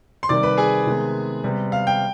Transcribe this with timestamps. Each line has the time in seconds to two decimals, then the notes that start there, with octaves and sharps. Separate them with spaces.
0.23 C6
0.29 C3 D#3 G3 D5 D6
0.43 B4 B5
0.58 G#4 G#5
0.86 C3 D#3 G#3 B3
1.44 C3 G3 B3
1.72 F5
1.87 G5